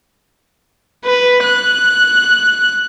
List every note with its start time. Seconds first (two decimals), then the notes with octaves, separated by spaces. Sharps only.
1.05 B4
1.44 F#6